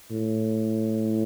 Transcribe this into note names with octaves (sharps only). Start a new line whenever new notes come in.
A2